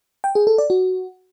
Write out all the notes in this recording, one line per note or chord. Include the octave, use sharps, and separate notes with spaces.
G5
G#4
A4
D5
F#4